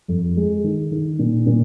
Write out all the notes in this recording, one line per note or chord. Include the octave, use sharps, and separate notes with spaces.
F2
G#3
D#3
D#3
A#2
A#2